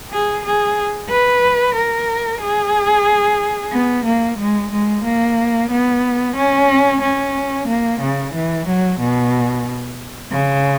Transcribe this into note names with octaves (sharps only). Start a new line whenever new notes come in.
G#4
G#4
B4
A#4
G#4
B3
A#3
G#3
G#3
A#3
B3
C#4
C#4
A#3
C#3
E3
F#3
B2
C#3